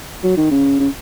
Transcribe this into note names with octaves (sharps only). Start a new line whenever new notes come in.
F#3
D#3
C#3
C#3